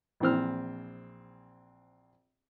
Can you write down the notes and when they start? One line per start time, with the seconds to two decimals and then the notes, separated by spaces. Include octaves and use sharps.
0.20 A#1 E3 C4 F6